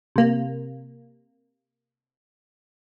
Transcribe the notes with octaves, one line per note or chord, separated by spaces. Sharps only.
C3 A#3